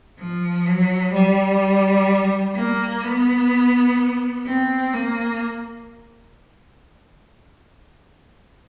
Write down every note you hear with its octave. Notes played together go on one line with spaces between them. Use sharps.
F3
F#3
G3
A#3
B3
C4
A#3